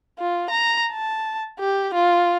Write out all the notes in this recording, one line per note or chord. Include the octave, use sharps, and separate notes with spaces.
F4
A#5
A5
G4
F4